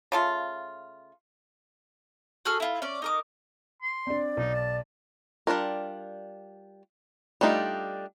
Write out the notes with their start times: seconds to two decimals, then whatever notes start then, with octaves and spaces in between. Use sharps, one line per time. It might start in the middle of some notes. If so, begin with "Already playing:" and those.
0.12 C#3 A3 F4
2.45 F#4 G#4 A4 F6
2.60 E4 F4
2.82 C#4 D5
3.02 D#4 A#4 D6
3.82 C6
4.07 C4 D4 D5
4.37 B1 D#4
4.54 A5
5.47 G3 D4 F4 A#4
7.41 G3 A3 D4 D#4 F4